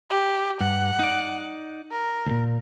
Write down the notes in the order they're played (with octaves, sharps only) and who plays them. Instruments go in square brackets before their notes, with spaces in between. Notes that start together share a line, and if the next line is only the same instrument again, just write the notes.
[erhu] G4
[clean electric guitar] G2 [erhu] F#5
[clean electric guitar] D#4 D5
[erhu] A#4
[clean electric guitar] D2 A#2